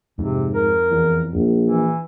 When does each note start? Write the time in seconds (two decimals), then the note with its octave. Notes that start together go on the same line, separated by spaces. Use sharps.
0.19 F2 G#2 C3
0.54 A#4
0.91 E2
1.33 A#1
1.65 E3